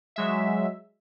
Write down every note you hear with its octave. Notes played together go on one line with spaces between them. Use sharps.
F#3 G#3 E5